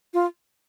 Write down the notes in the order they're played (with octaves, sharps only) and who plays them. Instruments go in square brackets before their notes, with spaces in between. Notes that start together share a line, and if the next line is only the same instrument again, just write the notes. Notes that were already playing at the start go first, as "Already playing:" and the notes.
[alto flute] F4